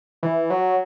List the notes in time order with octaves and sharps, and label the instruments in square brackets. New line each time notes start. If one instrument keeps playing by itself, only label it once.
[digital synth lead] E3
F#3